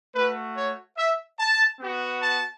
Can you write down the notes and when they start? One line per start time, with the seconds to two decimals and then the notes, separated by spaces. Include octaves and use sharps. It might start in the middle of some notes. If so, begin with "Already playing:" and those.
0.15 A3 F#4 B4
0.56 C#5
0.98 E5
1.39 A5
1.80 B3 F#4
2.22 A5